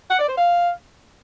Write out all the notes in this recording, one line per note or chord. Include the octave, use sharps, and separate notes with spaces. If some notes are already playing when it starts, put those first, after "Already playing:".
F#5
D5
C5
F5